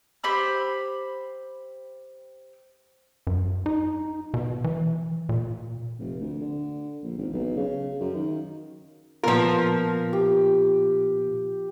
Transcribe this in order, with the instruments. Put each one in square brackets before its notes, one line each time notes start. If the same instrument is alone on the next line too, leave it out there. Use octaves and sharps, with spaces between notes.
[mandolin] G4 C5 B5 E6
[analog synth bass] F#2
D#4
B2
E3
A#2
[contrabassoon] F1
D2
D3
A#1
G#1
B1
C#3
F#2
D#3
[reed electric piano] A#2 B3 F4 [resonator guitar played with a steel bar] F3 A#4
[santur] G4